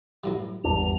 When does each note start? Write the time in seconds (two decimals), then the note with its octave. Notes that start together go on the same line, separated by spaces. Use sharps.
0.24 F#2 A2 G3
0.64 G#1 E2 G2 D4 F7